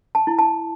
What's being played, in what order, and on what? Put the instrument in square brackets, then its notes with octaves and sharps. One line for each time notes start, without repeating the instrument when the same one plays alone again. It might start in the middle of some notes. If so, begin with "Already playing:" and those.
[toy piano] A5
E4
A5